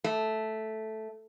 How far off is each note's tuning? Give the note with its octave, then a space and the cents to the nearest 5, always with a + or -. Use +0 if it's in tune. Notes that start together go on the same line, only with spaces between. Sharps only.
A3 -5